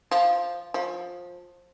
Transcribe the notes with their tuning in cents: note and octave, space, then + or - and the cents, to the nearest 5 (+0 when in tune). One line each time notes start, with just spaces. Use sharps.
F3 +0
F3 +20